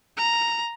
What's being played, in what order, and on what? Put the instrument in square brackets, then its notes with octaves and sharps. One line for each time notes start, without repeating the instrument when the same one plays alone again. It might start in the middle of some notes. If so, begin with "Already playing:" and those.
[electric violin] A#5